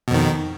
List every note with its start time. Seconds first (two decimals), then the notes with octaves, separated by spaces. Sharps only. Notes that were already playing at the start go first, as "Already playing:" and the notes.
0.08 B2
0.11 F2
0.14 D#3